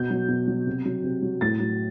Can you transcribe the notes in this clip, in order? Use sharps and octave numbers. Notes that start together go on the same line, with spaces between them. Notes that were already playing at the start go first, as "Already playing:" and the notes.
Already playing: B2 G6
F#3
B2
F#3
C3
F#3
C3
F#3
A2 A6
F#3